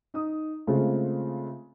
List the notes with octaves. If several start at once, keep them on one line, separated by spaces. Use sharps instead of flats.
D#4 D#6
C#3 G#3 A3 C4 F4